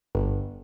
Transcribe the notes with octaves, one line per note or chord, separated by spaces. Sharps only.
G1